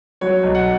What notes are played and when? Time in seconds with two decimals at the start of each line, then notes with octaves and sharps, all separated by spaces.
0.21 F#3 C#5
0.43 B1
0.55 F#5